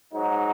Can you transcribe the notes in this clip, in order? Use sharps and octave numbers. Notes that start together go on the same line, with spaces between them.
G#2 F#3 D#4